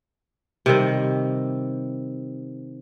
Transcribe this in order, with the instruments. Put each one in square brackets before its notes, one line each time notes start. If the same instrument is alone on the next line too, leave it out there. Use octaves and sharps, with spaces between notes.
[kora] C3 D#3 G3